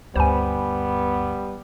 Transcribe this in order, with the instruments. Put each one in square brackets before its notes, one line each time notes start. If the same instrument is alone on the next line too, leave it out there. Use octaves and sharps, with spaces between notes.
[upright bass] D2 G2 [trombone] G3 [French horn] B3 [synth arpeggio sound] C5 G#5